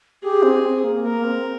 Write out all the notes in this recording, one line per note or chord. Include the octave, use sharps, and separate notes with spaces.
G4 G#4
C4
C4
A#3
A#3 A#4
C4